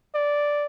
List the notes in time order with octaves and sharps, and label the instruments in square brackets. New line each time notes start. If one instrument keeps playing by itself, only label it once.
[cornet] D5